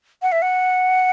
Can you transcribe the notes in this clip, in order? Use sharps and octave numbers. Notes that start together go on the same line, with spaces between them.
F#5
E5
F#5